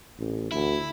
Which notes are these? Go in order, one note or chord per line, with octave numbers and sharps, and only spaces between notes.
A1
D2 E4